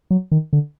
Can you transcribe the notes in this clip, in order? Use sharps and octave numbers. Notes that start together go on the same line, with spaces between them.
F#3
D#3
D3